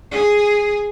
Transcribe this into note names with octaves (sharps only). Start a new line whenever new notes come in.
G#4